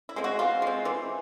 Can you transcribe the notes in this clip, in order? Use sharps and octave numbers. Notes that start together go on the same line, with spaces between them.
E4
G#3 C4
F#4
E3 F4
G#3 C4
E3